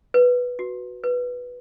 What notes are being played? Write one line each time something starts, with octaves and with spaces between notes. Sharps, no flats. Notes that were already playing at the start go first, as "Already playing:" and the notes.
B4
F#4
B4